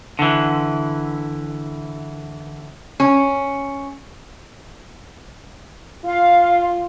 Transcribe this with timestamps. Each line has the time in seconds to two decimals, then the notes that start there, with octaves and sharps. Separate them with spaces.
0.19 D3 E3
3.00 C#4
6.05 F4 F5